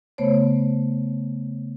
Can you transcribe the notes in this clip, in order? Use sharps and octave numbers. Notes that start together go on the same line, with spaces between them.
C#3 A3 B3 C5 C#5